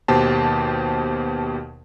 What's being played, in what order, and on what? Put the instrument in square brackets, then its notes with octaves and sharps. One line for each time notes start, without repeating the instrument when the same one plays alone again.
[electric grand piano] D#2 B2 G4 C5 A5